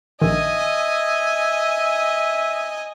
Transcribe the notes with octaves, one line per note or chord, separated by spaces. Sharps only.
A#1 D#3 D#5 E5 G#5